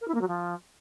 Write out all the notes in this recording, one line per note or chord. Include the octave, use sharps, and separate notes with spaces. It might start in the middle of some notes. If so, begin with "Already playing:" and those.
A#4
E4
A#3
F#3
F3